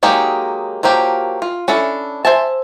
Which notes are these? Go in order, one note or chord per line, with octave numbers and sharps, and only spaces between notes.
F#3 G#3 A#3 D#4 G4
F3 F#3 A#3 G4
F4
C#4 D4 E4 A4
C5 E5 G#5 A5